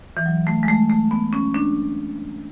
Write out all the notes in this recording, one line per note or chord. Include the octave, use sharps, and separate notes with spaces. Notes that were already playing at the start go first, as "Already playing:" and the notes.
E3
F#3
A3
G#3
A3
A3
B3
C#4
D4